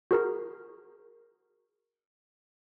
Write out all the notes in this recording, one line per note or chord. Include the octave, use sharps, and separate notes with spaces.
F#4 G#4 A#4 A#5